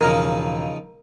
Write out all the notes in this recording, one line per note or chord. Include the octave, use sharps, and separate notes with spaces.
E1 C#3 F3 D#4 A#4